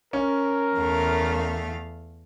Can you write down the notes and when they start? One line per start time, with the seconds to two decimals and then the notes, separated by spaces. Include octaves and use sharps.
0.13 C#4 A#4
0.76 E2 A3 F5